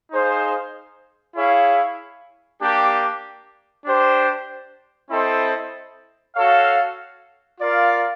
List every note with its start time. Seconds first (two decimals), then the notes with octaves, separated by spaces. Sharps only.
0.12 D#4 G#4 C5 F5
1.36 E4 G#4 C#5 F5
2.61 A#3 D4 G4
3.86 D4 G4 C5
5.10 C4 E4 A4 C5 D#5
6.35 F#4 A4 C#5 F5
7.60 F4 A#4 D5 F5